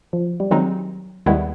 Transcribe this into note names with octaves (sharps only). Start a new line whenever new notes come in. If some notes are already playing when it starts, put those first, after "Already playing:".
F3
G3
D#3 F#3 G#3 C4 D#4
D#2 D#3 G3 G#3 B3 E4